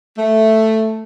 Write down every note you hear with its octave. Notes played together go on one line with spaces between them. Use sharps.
A3